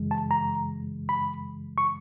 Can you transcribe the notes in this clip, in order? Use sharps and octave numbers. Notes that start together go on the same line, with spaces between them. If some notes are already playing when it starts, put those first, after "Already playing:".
Already playing: F#2 C#3 E3 G#3
A5
A#5
B5
C#6